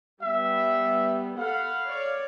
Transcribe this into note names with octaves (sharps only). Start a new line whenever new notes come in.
G3 B3 E5
A4 F5 F#5 B5
C#5 D5